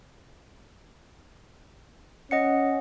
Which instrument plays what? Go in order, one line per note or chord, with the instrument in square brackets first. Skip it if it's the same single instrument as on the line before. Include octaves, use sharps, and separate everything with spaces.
[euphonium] C#4 [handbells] D#5 F#5 C#7